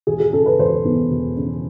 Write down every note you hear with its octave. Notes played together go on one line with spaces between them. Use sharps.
E1 G#4
G#4
C#3 A4
B4
E1 C5
E2
E1
C#3